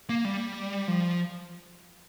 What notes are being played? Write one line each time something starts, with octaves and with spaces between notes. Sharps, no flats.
A#3
G3
F3